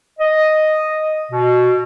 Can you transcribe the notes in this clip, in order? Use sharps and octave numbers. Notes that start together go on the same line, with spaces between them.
D#5
B2